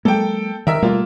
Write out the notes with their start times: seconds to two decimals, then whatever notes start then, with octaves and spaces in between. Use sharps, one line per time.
0.05 F#3 G#3 A#3 A4 G5
0.67 D#3 A#4 E5 E6
0.82 B2 G3 A3 A#3 F4